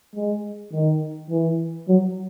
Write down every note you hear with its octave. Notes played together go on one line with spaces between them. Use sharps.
G#3
D#3
E3
F#3